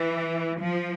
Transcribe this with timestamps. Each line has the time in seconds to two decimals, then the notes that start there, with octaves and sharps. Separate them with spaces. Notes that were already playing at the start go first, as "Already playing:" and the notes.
Already playing: E3
0.62 F3